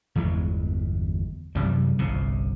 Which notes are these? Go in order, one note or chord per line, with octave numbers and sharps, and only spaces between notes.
G1 E2 E3 G#3
F#2 C3 E3 G3
G1 C2 C3